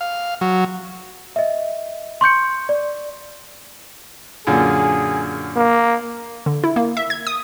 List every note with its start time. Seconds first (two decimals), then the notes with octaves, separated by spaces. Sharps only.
0.01 F5
0.41 F#3
1.36 D#5 E5
2.21 C6 C#6 G6 C#7
2.69 D5
4.47 F#2 A#2 D3 G#4
5.57 A#3
6.46 D3
6.64 E4
6.76 A#3
6.97 E5
7.10 G#6
7.27 D#6